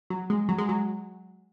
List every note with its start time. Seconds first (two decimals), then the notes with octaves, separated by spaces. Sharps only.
0.10 F#3
0.30 G#3
0.49 F#3
0.58 G#3
0.69 F#3